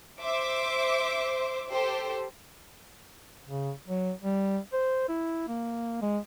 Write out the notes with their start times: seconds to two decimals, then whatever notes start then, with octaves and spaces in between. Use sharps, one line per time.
0.21 C5 E5 D6
1.71 G4 A4 C5
3.46 C#3
3.87 F#3
4.23 G3
4.73 C5
5.08 E4
5.48 A#3
6.02 G#3